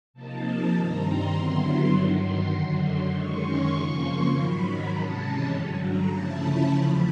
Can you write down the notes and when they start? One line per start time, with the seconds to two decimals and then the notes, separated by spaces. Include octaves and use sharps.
0.14 C3 F3 A#3 D#4 A5
0.73 G2 D#3 G3 C4 A#5
1.03 C6
1.32 G2 D3 F#3 B3 E4
1.92 G2 D#3 F#3
2.21 C6
2.51 F#2 D3 F#3
2.81 C6
3.10 F#2 D#3 G#3 C#4 C#6
3.40 C6
3.69 F2 C#3 F3 A#3 C#6
3.99 C6
4.29 G#2 D#3 F#3 B5
4.59 A#5
4.88 C3 E3 G#3 C#4 A5
5.47 G2 D3 F#3
5.77 A#5
6.07 C#3 F3 A3 C#4 E4 A5
6.37 B5
6.66 E2 C#3 F3 B5